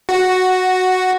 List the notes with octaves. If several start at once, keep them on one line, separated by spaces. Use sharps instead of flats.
F#4